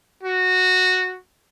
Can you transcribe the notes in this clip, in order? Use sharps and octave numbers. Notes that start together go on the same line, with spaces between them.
F#4